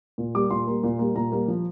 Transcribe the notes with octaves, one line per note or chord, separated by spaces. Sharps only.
A#2
G3 A#3 D6
A#2 C6
G3 A#3
A#2
G3 A#3
A#2 A#5
G3 A#3
F3